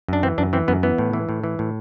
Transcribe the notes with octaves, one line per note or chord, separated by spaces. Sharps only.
F#2 D4
E3 C4
F#2 D4
E3 C4
F#2 B3
E3 B3
A2
E3
A2
E3
A2